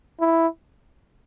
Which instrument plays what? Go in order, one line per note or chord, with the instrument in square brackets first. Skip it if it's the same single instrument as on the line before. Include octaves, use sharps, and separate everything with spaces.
[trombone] E4